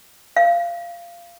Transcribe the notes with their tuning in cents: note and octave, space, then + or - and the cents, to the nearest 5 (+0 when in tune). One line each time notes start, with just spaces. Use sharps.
F5 -20